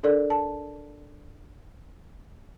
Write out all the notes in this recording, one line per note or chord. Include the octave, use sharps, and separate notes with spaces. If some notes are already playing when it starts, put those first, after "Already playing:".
D4 A4 A#4 D5
A5